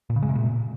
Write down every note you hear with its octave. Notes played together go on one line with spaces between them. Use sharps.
A#2
C#3
G#3
C3
A#2